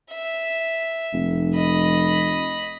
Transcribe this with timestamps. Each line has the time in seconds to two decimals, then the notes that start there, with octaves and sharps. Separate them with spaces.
0.11 E5
1.13 F1
1.56 D#5 B5